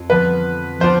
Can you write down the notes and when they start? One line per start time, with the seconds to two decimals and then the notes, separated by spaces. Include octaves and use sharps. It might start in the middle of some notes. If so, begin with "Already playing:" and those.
Already playing: F2
0.09 D3 F3 B3 B4
0.80 F3 B3 D4 F4 C5